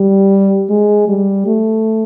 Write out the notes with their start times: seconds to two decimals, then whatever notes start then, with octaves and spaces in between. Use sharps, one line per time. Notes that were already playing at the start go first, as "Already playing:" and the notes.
Already playing: G3
0.70 G#3
1.08 G3
1.46 A3